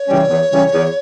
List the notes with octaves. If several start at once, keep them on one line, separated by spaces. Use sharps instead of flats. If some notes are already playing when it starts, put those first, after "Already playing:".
Already playing: C#5
C#3 E3 G3 C#4
E2
C#3 E3 G3 C#4
E2